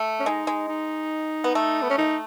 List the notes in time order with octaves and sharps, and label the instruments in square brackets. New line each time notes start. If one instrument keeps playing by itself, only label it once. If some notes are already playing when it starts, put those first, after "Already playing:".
Already playing: [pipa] A3
[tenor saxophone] C#4
[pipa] G#3 [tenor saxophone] D#4
[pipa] G#3
[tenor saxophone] D#4
[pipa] B3
A3
[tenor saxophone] B3
C#4
D#4